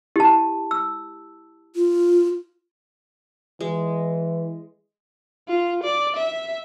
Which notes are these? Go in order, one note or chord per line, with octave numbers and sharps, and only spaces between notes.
E4 G4 A5
E6
F4
E3 G#3
F4
D5
E5